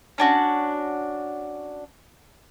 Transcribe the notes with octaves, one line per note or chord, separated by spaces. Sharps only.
C#4 D4 F#4